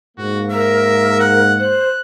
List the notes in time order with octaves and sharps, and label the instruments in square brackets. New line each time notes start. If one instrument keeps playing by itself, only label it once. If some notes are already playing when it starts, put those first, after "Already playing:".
[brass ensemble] G#2 A#3 [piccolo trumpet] F#4
[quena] A#4 [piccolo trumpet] E5
[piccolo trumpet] F#5
[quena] C5 [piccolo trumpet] F#6